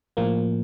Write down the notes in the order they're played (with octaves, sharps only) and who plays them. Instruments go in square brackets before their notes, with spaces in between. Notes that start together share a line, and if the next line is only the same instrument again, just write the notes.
[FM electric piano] A2 F3 A#3